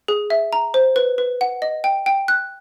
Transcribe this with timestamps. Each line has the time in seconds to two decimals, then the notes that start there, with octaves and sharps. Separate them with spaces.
0.08 G#4
0.30 E5
0.53 A#5
0.74 C5
0.96 B4
1.18 B4
1.41 F#5
1.62 D#5
1.84 G5
2.06 G5
2.28 F#6